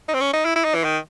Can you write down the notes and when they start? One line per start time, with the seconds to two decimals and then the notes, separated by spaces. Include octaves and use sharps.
0.08 D#4
0.14 C4
0.21 C#4
0.34 D#4
0.45 E4
0.56 E4
0.65 D#4
0.75 E3
0.84 D#3